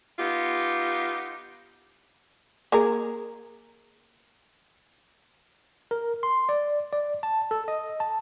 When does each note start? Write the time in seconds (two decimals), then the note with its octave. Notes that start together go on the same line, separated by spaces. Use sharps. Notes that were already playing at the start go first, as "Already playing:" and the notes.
0.19 B3 D#4 F4 G4
2.72 A#3 G#4 A#4
5.91 A#4
6.23 C6
6.49 D5
6.93 D5
7.23 A5
7.51 A4
7.68 D#5
8.00 A5